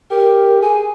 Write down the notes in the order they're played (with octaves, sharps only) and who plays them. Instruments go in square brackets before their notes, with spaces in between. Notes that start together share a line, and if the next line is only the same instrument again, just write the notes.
[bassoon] G4 [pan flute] A#4
[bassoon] G#4 [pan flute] G#5